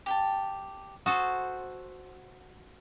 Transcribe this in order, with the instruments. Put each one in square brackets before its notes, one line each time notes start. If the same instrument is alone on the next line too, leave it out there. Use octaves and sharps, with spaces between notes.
[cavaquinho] G4 G5 A5
[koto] F#4 A4 C5 [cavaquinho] D#6